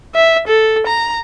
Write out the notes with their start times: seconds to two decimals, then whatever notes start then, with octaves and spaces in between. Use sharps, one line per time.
0.15 E5
0.47 A4
0.87 A#5